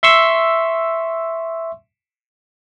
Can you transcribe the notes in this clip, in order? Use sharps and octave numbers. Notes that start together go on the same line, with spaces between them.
E5 C6 C#6 E6